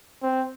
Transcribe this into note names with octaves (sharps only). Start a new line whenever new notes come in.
C4